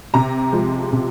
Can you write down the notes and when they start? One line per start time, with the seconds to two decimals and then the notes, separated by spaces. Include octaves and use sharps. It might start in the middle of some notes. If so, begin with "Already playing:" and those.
0.14 C3 A#5
0.52 F3 G#3
0.92 C3